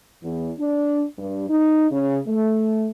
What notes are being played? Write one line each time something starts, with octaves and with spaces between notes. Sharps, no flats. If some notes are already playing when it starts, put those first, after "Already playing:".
E2
D4
G2
D#4
C#3
A3